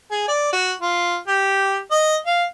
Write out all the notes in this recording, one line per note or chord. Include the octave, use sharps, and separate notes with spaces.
G#4
D5
F#4
F4
G4
D#5
F5